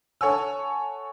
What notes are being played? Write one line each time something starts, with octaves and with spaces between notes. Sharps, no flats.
A4 C#5 F#5 G#5 E6